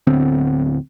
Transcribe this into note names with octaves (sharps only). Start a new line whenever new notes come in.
D1 D3 B3 C4